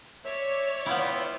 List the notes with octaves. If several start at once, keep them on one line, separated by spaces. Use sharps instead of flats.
C#5 D5 E5
B3 E4 F4 E5 G5